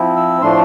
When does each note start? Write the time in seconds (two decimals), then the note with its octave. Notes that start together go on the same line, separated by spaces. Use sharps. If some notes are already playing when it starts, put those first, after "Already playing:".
Already playing: F3 C4 E4
0.17 E6
0.42 A2 F3 A3 D4 C6